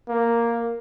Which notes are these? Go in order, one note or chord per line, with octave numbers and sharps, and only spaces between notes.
A#3